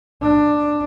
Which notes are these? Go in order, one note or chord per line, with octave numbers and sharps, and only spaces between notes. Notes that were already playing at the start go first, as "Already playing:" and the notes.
D4